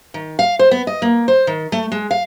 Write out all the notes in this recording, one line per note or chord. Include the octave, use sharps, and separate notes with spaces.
D#3
F5
C5
B3
D#5
A#3
C5
D#3
A3
G#3
F5